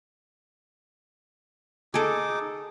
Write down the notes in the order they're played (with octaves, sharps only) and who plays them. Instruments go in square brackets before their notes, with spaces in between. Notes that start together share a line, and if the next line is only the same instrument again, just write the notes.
[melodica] D#4 D6 [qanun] G#4 A4